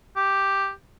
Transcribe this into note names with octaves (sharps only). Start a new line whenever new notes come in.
G4